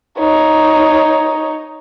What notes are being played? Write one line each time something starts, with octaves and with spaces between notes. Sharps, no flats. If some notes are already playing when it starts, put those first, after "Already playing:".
D#4 C#5